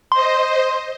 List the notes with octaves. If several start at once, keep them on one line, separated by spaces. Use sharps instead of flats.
C5 D#5 C6